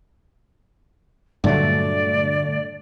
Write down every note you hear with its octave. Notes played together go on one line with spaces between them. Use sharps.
G2 A#2 D3 F#3 A3 D5